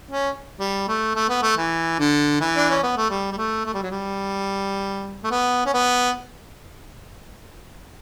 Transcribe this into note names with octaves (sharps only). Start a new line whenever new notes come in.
C#4
G3
A3
A3
B3
A3
E3
D3
E3
D4
C#4
B3
A3
G3
G3
A3
A3
G3
F#3
G3
A3
B3
C#4
B3